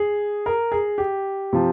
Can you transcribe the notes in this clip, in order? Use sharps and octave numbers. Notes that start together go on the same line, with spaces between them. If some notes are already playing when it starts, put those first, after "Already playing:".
Already playing: G#4
A#4
G#4
G4
C3 F3